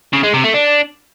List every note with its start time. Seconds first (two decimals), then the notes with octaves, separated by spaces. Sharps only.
0.13 C#3
0.23 G#3
0.33 C3
0.44 A3
0.54 D4